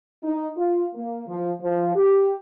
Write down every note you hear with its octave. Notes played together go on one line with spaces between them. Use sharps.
D#4
F4
A#3
F3
F3
G4